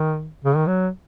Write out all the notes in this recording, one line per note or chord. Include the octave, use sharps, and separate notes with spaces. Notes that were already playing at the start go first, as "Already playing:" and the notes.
Already playing: D#3
C#3
D#3
F#3